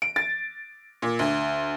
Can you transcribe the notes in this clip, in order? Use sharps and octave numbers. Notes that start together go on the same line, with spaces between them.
D7
A6
A#2
D2